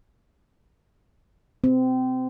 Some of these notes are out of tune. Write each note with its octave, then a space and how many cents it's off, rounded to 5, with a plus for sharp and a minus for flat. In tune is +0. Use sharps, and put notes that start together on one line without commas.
C4 -25